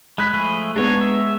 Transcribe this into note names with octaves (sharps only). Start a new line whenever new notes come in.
G#3 B5 F#6 B6
F3 A3 G#4
G#3 B3 D4 D#4 C#5
E5